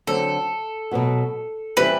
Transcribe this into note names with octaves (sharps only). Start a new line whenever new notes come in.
D3 F#3 C4 A4
B2 F#3 B3 F#4
E3 G3 C4 E4 G4 B4